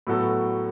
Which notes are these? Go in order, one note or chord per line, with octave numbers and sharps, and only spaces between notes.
A2 F#3 B3 F#4 A4